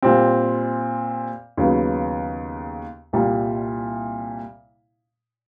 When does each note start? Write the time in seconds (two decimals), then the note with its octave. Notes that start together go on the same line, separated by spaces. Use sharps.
0.02 A#2 G3 C4
1.57 D#2 C#3 F#3 B3
3.13 C2 A#2 G3